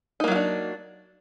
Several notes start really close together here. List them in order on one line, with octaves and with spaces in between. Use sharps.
D#4 A#3 F#3 F4 D4